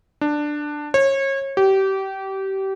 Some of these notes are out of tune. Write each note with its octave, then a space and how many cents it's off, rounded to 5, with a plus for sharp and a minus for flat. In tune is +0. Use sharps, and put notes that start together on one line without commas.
D4 +10
C#5 -30
G4 -25